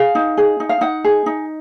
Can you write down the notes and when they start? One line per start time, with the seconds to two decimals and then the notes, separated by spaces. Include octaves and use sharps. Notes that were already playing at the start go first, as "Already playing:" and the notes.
Already playing: G#4 F5
0.15 D#4
0.37 G#4
0.60 D#4
0.69 F5
0.81 D#4 F#5
1.04 G#4
1.26 D#4